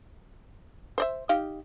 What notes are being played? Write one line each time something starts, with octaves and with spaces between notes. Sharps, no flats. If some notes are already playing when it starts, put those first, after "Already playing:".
C5 D5 E5
D#4 G4 F5